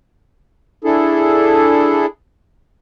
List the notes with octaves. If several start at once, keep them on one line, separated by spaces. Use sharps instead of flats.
D4 E4 G#4 A4